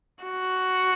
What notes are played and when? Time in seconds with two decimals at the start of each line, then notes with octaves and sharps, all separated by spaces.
0.24 F#4